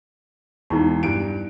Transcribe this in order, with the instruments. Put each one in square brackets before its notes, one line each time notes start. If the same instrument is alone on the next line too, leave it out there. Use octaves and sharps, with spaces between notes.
[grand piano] E1 [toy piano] D#4 E4 A5
[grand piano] G2 D7